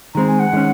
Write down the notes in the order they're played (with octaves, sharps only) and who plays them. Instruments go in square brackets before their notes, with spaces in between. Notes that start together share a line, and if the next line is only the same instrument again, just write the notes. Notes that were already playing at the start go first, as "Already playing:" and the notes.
[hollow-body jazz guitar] D#3 G#3 C4 [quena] A#5
[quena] G#5
F#5
[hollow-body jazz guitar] D#3 G#3 C#4